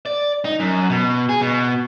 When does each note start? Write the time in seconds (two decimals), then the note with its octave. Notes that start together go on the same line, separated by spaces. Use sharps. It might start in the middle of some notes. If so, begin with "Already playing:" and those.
0.06 D5
0.45 D#4
0.59 F#2
0.89 B2
1.29 G#4
1.41 B2